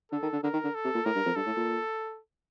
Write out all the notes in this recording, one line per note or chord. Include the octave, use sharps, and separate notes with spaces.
D3 A4
D#3
D3
D3 A#4
D#3
D3
A4
C3
A#2
A2 A#4
G2
F2
G2 A4
A2
A#2